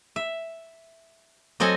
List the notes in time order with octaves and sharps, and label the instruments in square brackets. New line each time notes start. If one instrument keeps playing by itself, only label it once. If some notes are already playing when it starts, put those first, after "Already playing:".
[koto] E5
F#3 C4 A4 D#5 G#5